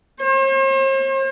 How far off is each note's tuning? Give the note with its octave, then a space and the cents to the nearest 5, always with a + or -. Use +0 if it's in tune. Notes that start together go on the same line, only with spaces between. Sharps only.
C5 +45